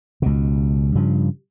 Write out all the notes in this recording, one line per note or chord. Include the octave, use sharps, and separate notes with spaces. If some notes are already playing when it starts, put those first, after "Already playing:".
C#2 B2
G2 C#3 F3